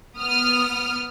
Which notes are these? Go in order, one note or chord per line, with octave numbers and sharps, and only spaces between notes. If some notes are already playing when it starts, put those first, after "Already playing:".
B3 D#6 F6